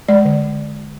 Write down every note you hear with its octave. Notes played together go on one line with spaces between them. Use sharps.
G#3 D5
D3